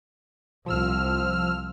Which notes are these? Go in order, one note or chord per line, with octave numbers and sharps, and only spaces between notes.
C2 F3 E6 F6